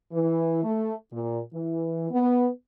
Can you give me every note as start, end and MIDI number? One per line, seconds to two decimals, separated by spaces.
0.12 0.62 52
0.64 0.93 57
1.12 1.39 46
1.54 2.08 52
2.10 2.47 59